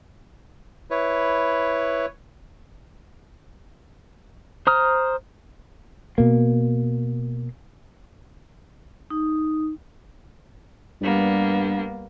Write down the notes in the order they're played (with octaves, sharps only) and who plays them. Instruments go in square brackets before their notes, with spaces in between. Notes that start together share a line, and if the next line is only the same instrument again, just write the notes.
[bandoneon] E4 B4 C#5
[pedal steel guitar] C5 A#5 D#6 F6
[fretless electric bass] B2 A#3
[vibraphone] D#4
[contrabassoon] G2 [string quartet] G3 A#3 B3